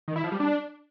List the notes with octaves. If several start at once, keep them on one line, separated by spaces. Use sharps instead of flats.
D#3
E4
F3
G3
D4